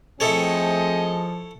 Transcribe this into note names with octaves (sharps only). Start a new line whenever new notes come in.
F3 A3 C4 E4 G#4 A4 C#5 D#5